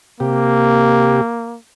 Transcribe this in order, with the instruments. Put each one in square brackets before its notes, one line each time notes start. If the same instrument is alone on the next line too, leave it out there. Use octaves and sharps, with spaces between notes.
[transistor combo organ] C3 G4 [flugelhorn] A#3